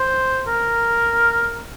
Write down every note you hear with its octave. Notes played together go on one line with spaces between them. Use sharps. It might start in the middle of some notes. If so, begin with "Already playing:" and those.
Already playing: C5
A#4